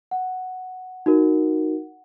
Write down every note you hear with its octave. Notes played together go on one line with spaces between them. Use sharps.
F#5
D#4 F#4 A#4